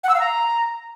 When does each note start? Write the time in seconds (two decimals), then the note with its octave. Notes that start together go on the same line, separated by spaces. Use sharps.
0.04 F#5
0.09 E6
0.14 F5
0.20 A#5